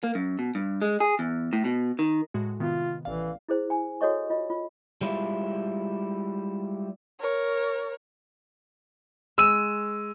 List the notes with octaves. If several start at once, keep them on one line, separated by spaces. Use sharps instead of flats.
A#3
F#2
B2
G2
G#3
G#4
E2
A2
B2
D#3
A2 G#3 F#4
C3 D#3 B3 F4
A1 E3 D5 F5
E4 G#4 C5
G#5
F#4 A4 C#5 D#5 C#6
F4 D#5
F4
G3 G#3 E4 F4
A#4 C#5
G#3 E6 D#7